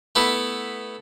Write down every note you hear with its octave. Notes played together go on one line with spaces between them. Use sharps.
A3 B3 E4